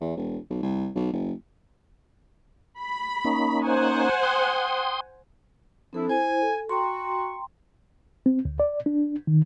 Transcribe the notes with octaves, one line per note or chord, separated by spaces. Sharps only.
E2
E1
B1
C2
B1
F#1
B5
A#3 C#4 D#4
C5 F#5 G#5
G5 C6 D#6
F3 C4 D4 E4 A4
E4 C5 G#5
A4
F#4 G5 A#5 C6 C#6
C4
D2
D5
D4
D#3